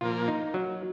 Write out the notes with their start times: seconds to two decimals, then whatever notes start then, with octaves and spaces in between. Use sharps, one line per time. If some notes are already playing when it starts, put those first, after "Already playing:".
0.01 A#2 F3 A#3 F4
0.28 D#4
0.54 F#3